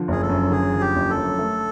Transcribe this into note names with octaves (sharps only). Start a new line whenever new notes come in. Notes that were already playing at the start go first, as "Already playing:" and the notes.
Already playing: D3 F3
F#1 G#4
A4
F#2
D3 G#4
F3
G4
F#1
A4
F#2
A3